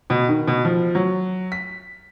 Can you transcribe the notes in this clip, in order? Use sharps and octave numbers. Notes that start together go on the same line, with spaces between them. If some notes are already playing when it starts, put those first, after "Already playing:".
B2
D#3
B2
F3
F#3
B6